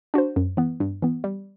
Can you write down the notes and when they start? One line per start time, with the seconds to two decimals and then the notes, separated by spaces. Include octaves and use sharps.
0.14 D4 F#4 C5
0.36 F#2
0.57 E3 B3
0.80 G2
1.02 E3 B3
1.24 G3